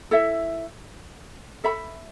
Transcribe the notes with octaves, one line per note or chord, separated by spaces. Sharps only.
E4 A4 E5
A4 E5 B5